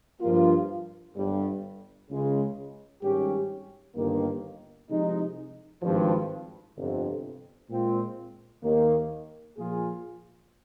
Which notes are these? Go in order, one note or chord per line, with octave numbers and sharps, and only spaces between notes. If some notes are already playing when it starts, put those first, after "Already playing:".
G2 F3 A#3 F4
G1 G2 G3
C#2 C#3 G#3
G#1 G#2 G3 C#4 G4
G1 G2 D#3 A#3
C2 C3 F3 G#3 D#4
G#1 G2 F3
G1 F2 C3
A#2 G#3 C4 F4
D#2 D#3 A#3
A#2 F3 A#3 F4 G#4